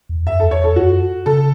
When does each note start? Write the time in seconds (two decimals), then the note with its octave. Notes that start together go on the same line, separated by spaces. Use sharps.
0.09 E2
0.26 F#2 E5
0.40 E2 A4
0.51 C#5
0.59 E2 A4
0.76 F#2 F#4
1.26 C#3 A4